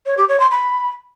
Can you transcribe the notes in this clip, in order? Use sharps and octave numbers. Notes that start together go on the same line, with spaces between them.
C#5
G4
C#5
C6
B5